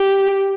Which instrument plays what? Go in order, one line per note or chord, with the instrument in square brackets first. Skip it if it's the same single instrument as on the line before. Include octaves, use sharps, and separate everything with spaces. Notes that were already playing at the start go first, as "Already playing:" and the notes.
Already playing: [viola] G4